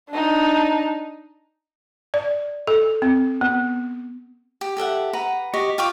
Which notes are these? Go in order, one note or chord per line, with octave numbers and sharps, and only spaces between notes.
D4 D#4
D5
A4
C4
B3
G4
G4 A4 E5 F#5
B4 F#5 A#5
F#4 G4 D#5 C#6
F4 G5 C#6 D6